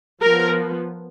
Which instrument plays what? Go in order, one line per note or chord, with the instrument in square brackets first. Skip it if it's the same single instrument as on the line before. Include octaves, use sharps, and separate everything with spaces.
[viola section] F3 B3 A#4